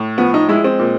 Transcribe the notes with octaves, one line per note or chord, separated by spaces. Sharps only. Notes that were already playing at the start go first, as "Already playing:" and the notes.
Already playing: A2
F3 B3
D#4
G#3 E4
C4
A#2